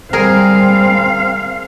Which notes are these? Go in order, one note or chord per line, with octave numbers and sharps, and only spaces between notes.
G3 C4 G#4 A#4 F5